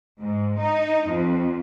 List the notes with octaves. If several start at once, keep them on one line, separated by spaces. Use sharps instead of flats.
G#2
D#4
F2